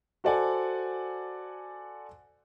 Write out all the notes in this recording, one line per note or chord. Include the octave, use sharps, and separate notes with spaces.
F#4 A4 C5 D5 F#5 G#5